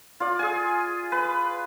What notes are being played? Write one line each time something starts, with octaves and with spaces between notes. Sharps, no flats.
F4 D5
G#4 G#5
B4